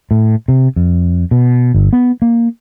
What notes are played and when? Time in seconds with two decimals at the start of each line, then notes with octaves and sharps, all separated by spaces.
0.11 A2
0.48 C3
0.76 F2
1.31 B2
1.74 G1
1.93 B3
2.22 A#3